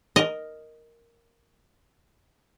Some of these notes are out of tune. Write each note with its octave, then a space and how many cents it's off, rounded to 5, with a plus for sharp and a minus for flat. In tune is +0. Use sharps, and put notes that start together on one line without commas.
A#4 +0 D#5 +0